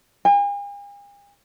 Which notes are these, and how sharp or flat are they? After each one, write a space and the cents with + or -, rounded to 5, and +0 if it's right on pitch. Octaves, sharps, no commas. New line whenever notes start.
G#5 -45